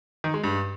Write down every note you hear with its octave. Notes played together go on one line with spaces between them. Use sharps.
D#3
G#3
G2